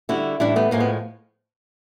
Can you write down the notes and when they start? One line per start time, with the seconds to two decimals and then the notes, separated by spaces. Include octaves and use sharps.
0.09 D3 G3 E4 F#4
0.40 A2 E3 G3 D4 E4
0.56 A3 B3
0.71 A2 F3 G#3 A#3
0.80 B3